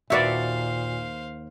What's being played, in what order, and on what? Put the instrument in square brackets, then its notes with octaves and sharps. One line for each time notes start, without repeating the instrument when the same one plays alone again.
[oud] D#2 F#4 B4 [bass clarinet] A#2 [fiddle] C5 F5 [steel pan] D5 E5